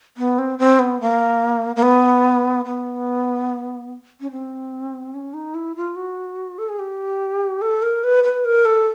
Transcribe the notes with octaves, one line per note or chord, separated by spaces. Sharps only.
B3
C4
C4
B3
A#3
A#3
B3
B3
C#4
C4
C#4
D#4
E4
F4
F#4
A4
G#4
G4
A4
A#4
B4
B4
A#4
A4